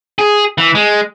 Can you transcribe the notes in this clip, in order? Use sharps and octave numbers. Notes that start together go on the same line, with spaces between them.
G#4
E3
G#3